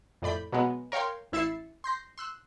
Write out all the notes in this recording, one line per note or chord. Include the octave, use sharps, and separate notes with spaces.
F2 A2 D5 B5 G6
B2 F#3 G#3 B3
A#4 C#5 F5 G5 C6
A1 E4 E5 A6 C7 C#7
C6 G6 A#6 C7
C6 E6 F#6